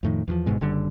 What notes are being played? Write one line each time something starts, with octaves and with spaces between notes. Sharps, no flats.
F2 A2 D#3
E2 E3 F3
G1 G#2 B2 G#3
F#1 D3 G3